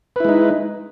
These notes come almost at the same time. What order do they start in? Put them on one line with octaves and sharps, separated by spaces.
B4 E4 G#3 D#4